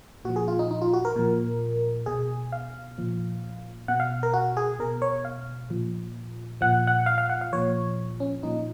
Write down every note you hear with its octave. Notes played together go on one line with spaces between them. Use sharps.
A#2 F3 F#4
G#4
F4
D#4
D#4
F4
F#4
A#4
A#2 F3
B2 G#4
F5
A#2 F3
B2 F#5
F5
A#4
F#4
G#4
B2 A#4
C#5
F5
A#2 F3
A#2 F3 F#5
F#5
F5
F5
F#5
F5
A#2 F3 C#5
C#4
A#2 F3 D#4